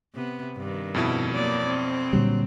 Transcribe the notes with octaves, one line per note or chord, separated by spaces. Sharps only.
C3 B3
G2 D#3
F2 B2 E4
F#3 A#3 D5
C4
A#2 D3 F#3 G3